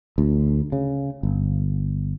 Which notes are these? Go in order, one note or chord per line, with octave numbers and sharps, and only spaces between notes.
D2
C#3
G1